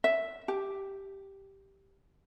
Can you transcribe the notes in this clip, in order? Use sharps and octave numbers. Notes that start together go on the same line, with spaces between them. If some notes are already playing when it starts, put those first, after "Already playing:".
E5
G4